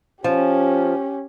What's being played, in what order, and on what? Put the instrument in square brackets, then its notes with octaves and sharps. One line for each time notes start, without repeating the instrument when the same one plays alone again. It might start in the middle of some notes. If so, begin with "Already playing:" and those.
[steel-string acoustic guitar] F3 [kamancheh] C#4 G4